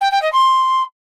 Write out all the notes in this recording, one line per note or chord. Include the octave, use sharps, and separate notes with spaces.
G5
G5
D#5
C6